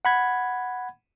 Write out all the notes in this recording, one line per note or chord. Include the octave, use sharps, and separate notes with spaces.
F#5 B5 G#6